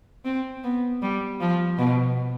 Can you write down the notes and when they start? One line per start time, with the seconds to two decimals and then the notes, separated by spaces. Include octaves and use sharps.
0.25 C4
0.64 B3
1.02 G3
1.40 F3
1.78 B2